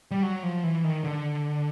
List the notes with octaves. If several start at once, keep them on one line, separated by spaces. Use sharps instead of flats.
G3
F#3
F3
E3
D#3
D3